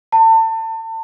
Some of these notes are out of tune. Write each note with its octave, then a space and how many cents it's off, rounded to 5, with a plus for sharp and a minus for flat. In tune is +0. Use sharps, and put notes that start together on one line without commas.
A5 +30